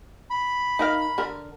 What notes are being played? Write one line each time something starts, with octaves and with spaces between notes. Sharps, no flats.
B5
D#4 A#4 F5
D3 A#4